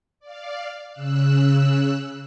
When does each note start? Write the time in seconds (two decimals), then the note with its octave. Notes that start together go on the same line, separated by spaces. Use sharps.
0.20 D5 F5
0.91 C#3 E6 F#6